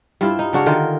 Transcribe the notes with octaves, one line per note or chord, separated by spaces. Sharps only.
G2 C4 E4 F4
D#4
C#3 D4 F#4 C#5
D3 D#3 F4 A#4